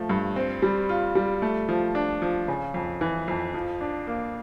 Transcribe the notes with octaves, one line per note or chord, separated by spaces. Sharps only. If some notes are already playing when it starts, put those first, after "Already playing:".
Already playing: F3 A3
G2
C4
G3
F4
G3
A3
F3
D4
F3
C#3
F2
E3
F2
F3
D4
A#3